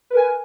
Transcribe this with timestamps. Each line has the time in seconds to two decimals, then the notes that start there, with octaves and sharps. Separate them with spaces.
0.10 B4
0.14 A#4
0.17 G#5